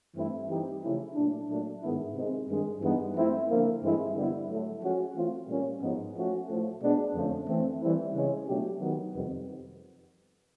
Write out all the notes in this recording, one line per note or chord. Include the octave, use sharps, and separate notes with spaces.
G2 E3 A3 C4 E4
E3 G3 C4 D#4 G4
C#3 F3 A3 C#4 E4
A#2 F#3 A3 D4
A#2 F#3 A3 D4
G#2 D#3 G#3 B3 E4
C3 D#3 G#3
G2 D#3 G#3
G2 E3 G#3 B3 D#4
F3 A3 C4 E4
D3 F3 A#3
G2 E3 G#3 C4 E4
D3 G3 B3 E4
A2 F#3 A3
F3 G#3 C#4 F#4
E3 A3 C4 F4
A#2 G3 A#3 C#4
G#2 F3 G#3 B3 D#4
F3 A3 C#4 F#4
A2 F3 A3
B2 G#3 B3 D4
F2 D3 F3 A3 C#4
E3 A3 C4
E3 G3 C4 E4
C#3 E3 G#3 C#4
B2 F#3 A3 D4 G4
D#3 F#3 B3
F2 C3 D#3 G3 B3